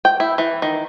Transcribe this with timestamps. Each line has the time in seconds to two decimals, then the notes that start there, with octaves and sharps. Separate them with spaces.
0.05 G5
0.20 E4
0.38 E3
0.62 D#3